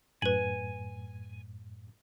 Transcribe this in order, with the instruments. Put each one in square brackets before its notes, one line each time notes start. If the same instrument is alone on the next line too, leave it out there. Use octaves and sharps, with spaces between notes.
[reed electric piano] F#2 A2 [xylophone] B4 F#7 [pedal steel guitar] G#5